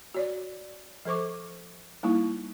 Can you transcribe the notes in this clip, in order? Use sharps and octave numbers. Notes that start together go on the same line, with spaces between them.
F#4 C#5 D5
F3 A4 C5 C#6 D6
G3 A#3 D#4 E4